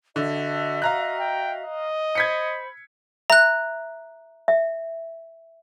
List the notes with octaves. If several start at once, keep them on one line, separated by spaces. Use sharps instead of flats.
D3 F#4 D#5 E5
F5 A#5 F#6
G5
D#5
C5 B5 G#6 B6 C#7
E5 A#5 F#6
E5